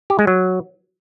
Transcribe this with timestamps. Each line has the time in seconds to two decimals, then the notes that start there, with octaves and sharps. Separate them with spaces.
0.10 G4
0.19 G#3
0.27 F#3